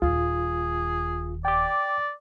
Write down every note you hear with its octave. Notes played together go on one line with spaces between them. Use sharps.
D#1 D#2 F4 G#4
D5 G5 D6